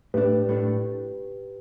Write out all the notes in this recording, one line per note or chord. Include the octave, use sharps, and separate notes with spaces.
A2 A3 D4 G4 B4
A2 A3 D4